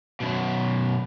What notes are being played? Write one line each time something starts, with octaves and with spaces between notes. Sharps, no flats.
F#2 B2